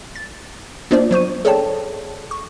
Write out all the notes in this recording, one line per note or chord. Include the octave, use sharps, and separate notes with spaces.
A6
A#3 B3 D4 F4 C5 D5
F#3 C5 C#6 D#7
G#4 A4 C#5 D5 G5 A5
C#6